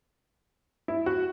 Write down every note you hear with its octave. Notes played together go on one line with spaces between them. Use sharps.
E4
F#4